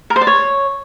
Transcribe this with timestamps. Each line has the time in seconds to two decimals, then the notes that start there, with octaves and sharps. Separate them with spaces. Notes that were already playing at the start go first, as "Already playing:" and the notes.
0.10 A#4
0.16 C5
0.21 D5
0.27 C#5